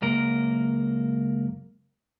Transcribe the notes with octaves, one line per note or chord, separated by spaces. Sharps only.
C#2 F#2 A#3 A#4